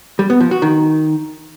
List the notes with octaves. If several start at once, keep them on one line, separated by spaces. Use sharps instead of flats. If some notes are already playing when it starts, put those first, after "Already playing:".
G3
B3
F3
F#4
D#3